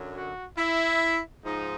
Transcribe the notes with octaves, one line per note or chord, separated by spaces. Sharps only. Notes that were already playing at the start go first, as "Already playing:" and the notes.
Already playing: F#2 D3 F#3
F#4
E4
G#2 F3 D#4